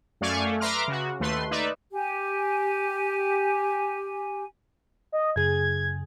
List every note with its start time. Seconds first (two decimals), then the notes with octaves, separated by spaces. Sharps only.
0.21 F#2 A3 D5 F5 G#5 C#6
0.45 A3
0.60 B4 E5 A#5 C6 D6 F6
0.88 C#3 F#4
1.20 D#2 A3 B4 C6
1.51 D#4 B4 D5 E5
1.92 G4 G#5
5.12 D#5
5.36 F#2 C#3 G#4 G#6